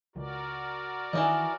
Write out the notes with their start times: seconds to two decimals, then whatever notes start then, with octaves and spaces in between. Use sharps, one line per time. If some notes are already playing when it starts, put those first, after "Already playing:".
0.16 C#2 F#4 A#4 D5
1.13 D#3 E3 D4 D#5